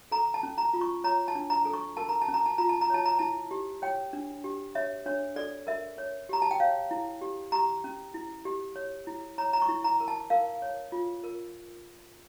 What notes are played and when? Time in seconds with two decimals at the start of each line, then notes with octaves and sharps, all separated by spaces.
0.11 A4 A#5
0.34 A5
0.43 C#4
0.58 A#5
0.73 F4
0.81 C#6
1.04 C#5 A#5
1.28 A5
1.35 D4
1.50 A#5
1.65 A4
1.73 C#6
1.97 A#4 A5
2.09 A#5
2.21 A5
2.28 C#4
2.34 A#5
2.46 A5
2.58 F4 A#5
2.69 A5
2.81 A#5
2.90 C#5 A5
3.06 A#5
3.19 E4 A5
3.51 G4
3.82 C#5 G5
4.13 D4
4.44 G4
4.75 C#5 E5
5.06 D4 C#5
5.36 A4 D5
5.67 A#4 E5
5.98 C#5
6.29 G4 A#5
6.42 A5
6.51 G5
6.60 C#5 F5
6.91 E4
7.21 G4
7.52 G4 A#5
7.84 C#4
8.14 E4
8.45 G4
8.76 C#5
9.07 E4
9.38 C#5 A#5
9.53 A#5
9.62 C#6
9.69 E4
9.84 A#5
10.00 A#4
10.08 A5
10.30 A#4 F5
10.62 C#5
10.92 F4
11.24 A#4